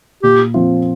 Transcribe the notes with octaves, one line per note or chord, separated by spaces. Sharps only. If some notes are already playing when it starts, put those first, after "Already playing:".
A#2 G4
F3 C4 F4